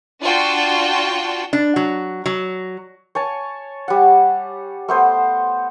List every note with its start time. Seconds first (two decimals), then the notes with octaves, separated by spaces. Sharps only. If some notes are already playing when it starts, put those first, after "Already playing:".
0.22 D4 F4 F#4 G5 A5
1.53 D4
1.76 F#3
2.26 F#3
3.15 C#5 G#5 A5
3.88 G3 F#5
4.89 A3 B3 C5